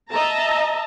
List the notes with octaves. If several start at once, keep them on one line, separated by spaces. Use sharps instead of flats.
D#5 E5 A5 A#5